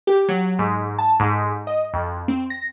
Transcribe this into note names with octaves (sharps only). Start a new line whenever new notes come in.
G4
F#3
G#2
A5
G#2
D#5
F2
C4
A#6